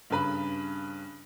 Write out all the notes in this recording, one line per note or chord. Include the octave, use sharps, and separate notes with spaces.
G2 C#3 B4 B5